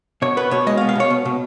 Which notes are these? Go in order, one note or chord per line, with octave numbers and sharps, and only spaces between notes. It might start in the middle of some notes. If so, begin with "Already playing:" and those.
B2 C#5
B3 B4
B2 C#5
G#3 D#5
F5
B3
F5
B2 C#5
B2
B2